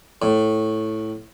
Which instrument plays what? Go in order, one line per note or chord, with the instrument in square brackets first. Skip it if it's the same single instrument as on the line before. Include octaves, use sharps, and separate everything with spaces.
[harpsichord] A2